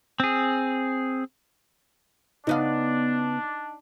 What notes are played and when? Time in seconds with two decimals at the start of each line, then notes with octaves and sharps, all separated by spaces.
0.20 C4 G#4
2.47 C#3 B3 D4 D#4 F5